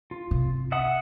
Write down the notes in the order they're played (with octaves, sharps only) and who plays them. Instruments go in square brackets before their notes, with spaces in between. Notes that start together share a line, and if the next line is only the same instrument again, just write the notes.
[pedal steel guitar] F4
[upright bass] C3
[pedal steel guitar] E5 F#5 D#6